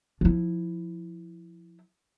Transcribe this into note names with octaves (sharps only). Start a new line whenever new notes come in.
F3 E4